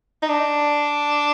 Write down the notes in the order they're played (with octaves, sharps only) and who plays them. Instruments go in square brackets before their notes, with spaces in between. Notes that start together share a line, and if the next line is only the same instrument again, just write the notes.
[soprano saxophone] D#4
D4